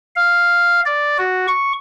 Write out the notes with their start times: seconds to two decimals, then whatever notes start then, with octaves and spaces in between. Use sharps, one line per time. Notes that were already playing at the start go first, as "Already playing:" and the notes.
0.16 F5
0.85 D5
1.18 F#4
1.48 C#6